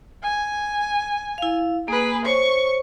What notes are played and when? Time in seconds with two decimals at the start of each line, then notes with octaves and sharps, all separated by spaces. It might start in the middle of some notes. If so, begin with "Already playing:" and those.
0.23 G#5
1.38 E4 F5
1.88 A#3 G#4 B4
2.25 C5 C#5 C#6